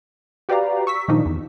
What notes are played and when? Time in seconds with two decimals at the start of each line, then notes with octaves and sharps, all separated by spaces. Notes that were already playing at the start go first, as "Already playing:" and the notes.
0.49 F#4 G4 B4 D5 F5 A#5
0.87 C#6 E6 B6
1.08 A#2 D#3 F3 D4 D#4
1.26 E2